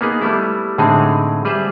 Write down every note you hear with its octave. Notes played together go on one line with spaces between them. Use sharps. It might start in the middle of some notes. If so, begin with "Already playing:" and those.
A#3 B3 D#4 G#4
G3 A3 B3 E4
A2 D3 G#3 C4 D#4 G#4
G3 G#4 B4 C5 E5